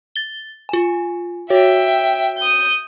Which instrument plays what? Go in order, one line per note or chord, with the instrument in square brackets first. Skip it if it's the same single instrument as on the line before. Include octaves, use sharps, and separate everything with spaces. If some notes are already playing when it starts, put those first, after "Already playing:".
[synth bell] A6 G7
F4 G#5
[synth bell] F#4 C#5 [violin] E5 G5
[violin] D#6 G6